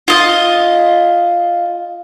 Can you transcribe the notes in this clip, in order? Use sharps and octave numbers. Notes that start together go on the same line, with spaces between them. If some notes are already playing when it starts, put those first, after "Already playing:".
F4 D#5